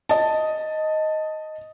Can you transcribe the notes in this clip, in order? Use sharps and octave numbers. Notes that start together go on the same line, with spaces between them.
D#5 A5